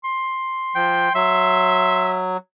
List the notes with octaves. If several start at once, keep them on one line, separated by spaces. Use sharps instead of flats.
C6
F3 G5
F#3 E5